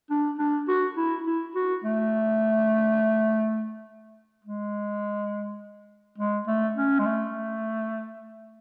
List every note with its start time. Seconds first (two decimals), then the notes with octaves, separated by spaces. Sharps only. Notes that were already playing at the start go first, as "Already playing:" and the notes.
0.10 D4
0.39 D4
0.68 F#4
0.97 E4
1.26 E4
1.55 F#4
1.84 A3
4.45 G#3
6.18 G#3
6.47 A3
6.76 C#4
6.99 G#3
7.06 A3